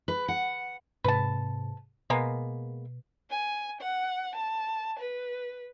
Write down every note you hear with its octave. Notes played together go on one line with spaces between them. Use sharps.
B4
F#5
G#2 C3 B4 A5
B2 G#3 A#3 B3
G#5
F#5
A5
B4